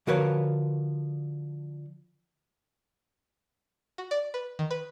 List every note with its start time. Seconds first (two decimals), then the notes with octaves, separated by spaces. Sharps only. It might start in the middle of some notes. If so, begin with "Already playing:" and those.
0.07 D3 F3 F#4 A#4 B4 C#5
3.98 F#4
4.11 D5
4.34 B4
4.59 D#3
4.71 B4